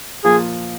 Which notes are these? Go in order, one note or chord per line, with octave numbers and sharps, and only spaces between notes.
A#2 F3 A#3 F4 G#4